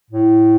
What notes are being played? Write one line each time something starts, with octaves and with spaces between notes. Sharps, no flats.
A2